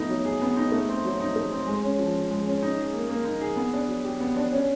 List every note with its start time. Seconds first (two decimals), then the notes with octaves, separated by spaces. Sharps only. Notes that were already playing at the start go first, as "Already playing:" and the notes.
Already playing: A3 B3 D#4
0.09 F#3
0.25 G#4
0.41 B3
0.57 D#4
0.72 A3
0.89 C4
1.05 F#3
1.20 D#4
1.36 A3
1.52 C4
1.67 G#3
1.83 C#4
1.99 F3
2.15 F3
2.30 G#3
2.46 C#4
2.62 D#4
2.78 G#4
2.94 A#3
3.09 A#3
3.25 D#4
3.41 G#4
3.56 B3
3.73 D4
3.88 F#3
4.04 G4
4.20 B3
4.36 D4
4.51 C#4